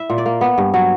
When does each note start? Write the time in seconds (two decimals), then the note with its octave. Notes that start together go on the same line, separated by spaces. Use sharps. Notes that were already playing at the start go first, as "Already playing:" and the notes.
Already playing: E4 E5
0.10 A#2
0.18 D5
0.26 A#3
0.41 B3
0.58 G2
0.74 F#3